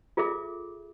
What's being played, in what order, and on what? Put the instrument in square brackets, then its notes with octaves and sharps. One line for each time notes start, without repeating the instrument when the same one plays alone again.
[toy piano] F4 G#4 A4 E5 D6